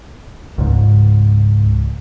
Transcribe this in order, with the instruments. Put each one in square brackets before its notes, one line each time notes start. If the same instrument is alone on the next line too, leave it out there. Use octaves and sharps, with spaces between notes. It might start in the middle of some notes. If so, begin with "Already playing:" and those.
[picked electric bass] C#2 G#2